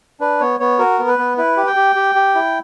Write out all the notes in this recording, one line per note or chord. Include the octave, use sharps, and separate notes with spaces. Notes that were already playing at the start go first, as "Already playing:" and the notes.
D4 B4
B3 C#5
B3 C#5
F#4 A#4
B3
B4
B3
E4 B4
G4
G5
G4
G4
G4
E4